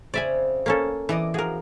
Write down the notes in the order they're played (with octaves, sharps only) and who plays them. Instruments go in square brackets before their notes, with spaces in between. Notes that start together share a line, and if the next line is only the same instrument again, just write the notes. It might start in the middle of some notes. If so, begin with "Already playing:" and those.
[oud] C#3 C4 [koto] D5 E5 G#5
[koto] A#3 C#4 A4
[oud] E2 D5 D#5 [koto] E3
[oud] F3 F#4 [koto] G#4 A#4